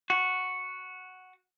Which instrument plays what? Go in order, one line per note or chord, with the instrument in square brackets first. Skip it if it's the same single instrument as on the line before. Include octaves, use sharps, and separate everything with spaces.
[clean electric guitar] F#4